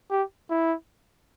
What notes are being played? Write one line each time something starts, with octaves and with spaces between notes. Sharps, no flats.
G4
E4